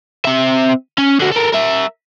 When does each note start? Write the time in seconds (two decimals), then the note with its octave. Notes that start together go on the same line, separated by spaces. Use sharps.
0.25 C4 E5
0.98 C#4
1.20 D3 F#4
1.31 A4 A#4
1.53 A#4 E5